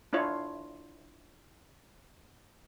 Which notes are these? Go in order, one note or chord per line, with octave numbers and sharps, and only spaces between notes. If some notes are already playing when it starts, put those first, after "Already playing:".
D4 E4 F4 C#5